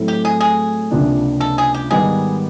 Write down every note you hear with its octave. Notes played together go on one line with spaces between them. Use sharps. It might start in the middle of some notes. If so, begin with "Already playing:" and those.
Already playing: A2 F#3 A3 C4 E4
G4
G#4
G#4
C#2 C3 F3 A#3 D4
A4
G#4
G4
G#2 D#3 G3 B3 G#4